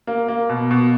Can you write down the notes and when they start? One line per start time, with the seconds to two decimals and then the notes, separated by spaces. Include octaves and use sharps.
0.07 A#3
0.28 A#3
0.49 B2
0.71 B2